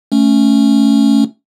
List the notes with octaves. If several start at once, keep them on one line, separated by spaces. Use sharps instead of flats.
A3 C#4